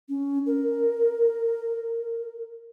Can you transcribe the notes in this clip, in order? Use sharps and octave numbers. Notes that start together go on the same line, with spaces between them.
C#4
A#4